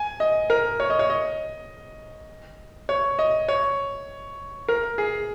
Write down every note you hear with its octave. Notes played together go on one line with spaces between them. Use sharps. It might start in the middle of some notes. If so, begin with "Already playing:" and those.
Already playing: G#5
D#5
A#4
C#5
D#5
C#5
D#5
C#5
D#5
C#5
A#4
G#4